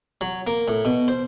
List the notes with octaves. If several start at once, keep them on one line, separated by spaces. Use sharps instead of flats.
F#3
A#3
A2
B2
C5